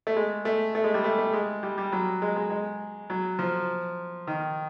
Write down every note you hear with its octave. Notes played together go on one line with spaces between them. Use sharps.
A3
G#3
A3
A3
G#3
G3
A3
A3
G#3
G3
G3
F#3
G#3
G#3
G#3
F#3
F3
D#3